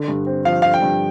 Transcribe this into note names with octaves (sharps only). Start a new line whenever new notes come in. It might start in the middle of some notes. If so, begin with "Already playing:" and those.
Already playing: D3
G2
C4
F3 F5
D3 F5
G5
G2